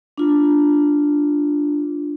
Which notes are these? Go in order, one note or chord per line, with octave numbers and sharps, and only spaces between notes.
D4 F4